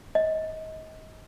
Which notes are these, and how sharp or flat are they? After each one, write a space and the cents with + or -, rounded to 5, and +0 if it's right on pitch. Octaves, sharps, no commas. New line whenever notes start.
D#5 +30